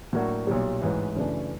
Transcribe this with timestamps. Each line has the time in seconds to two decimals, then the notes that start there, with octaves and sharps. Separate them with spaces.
0.13 A2 F#3 A#3 D4 F#4
0.47 B1 A#2 G3
0.82 A1 G#2 E3
1.16 F#2 C#3 E3 A3 D4